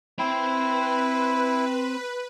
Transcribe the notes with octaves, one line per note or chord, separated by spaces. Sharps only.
C4 E4 B4 G5